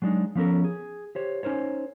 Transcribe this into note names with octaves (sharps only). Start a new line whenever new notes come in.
F#3 G#3 D4 D#4
F3 B3 C#4 A4 A#4
G#4
G4 C5 C#5
C#4 D#4 A#4 C5 C#5